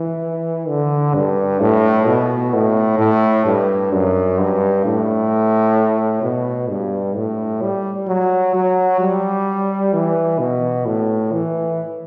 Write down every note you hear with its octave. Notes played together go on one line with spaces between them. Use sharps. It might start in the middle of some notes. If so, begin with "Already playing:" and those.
Already playing: E3
D3
G2
A2
B2
A2
A2
G2
F#2
G2
A2
B2
G2
A2
G3
F#3
F#3
G3
E3
B2
A2
E3